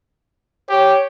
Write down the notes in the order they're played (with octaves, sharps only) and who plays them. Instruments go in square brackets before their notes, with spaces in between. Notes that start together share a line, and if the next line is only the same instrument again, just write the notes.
[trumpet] G4 [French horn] C#5